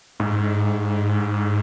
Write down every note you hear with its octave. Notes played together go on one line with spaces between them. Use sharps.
G#2